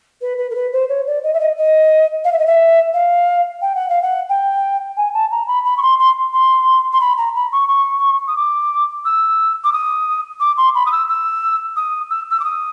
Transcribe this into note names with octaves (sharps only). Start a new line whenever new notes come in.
B4
B4
A#4
B4
C5
C#5
D5
D#5
E5
D#5
D#5
F5
E5
D#5
E5
F5
G5
F#5
F5
F#5
G5
G#5
A5
A#5
B5
B5
C#6
C6
C6
C6
C6
B5
A#5
B5
C#6
C#6
D#6
D6
E6
D6
D#6
D6
C6
B5
D#6
E6
E6
D#6
E6
E6
D6
D#6